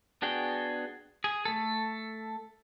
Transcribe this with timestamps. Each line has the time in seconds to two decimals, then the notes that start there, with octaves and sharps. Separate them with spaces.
0.22 B3 D4 F#4 G#4 G5
1.24 G#4
1.45 A3 A4